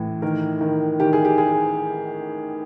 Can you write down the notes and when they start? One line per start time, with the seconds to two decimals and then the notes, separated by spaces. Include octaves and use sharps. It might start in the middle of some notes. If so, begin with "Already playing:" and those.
Already playing: A2 E3
0.22 D#3 A#4
0.61 D#3
1.00 D#3 G4
1.13 G#4
1.25 G4
1.38 G#4